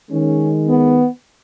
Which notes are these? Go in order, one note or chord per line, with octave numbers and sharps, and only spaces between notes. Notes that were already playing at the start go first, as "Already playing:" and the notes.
D#3 G#3 C#4
B3